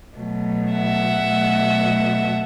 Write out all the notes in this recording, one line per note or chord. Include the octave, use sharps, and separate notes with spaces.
B2 F#3 A3
E5 F#5
B2 F#3 A3